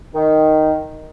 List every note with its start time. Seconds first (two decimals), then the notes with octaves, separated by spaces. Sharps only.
0.15 D#3